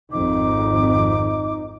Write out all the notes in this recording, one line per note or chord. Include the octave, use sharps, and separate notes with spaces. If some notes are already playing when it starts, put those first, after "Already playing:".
G#1 F2 D#4 D6